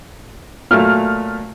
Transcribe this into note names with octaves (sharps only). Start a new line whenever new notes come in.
A#2 F#3 A3 F6